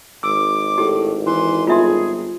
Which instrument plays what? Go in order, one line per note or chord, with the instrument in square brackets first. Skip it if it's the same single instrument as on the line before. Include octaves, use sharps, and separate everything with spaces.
[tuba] G#1 [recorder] D6 [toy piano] E6
[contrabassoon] A2 [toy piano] G4
[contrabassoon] E3 [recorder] C6
[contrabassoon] G1 [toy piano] F4 E5 C6 [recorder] G#4